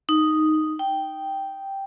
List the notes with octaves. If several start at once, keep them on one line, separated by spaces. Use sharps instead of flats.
D#4
G5